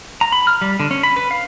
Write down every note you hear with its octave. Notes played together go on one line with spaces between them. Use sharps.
A#5
B5
F6
G3
D3
C#4
B5
B4
F5